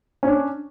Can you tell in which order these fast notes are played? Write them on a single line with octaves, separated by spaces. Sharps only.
C#4 C#5 D4